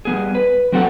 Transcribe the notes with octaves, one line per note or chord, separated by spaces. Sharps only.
G3 B3 G#4
B4
F#3 C4 F#4 A4 F#5